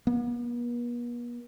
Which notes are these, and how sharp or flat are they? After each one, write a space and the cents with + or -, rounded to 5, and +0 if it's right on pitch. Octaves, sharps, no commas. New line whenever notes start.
B3 -45